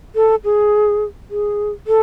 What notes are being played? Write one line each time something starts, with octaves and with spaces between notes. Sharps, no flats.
A4
G#4
G#4
A4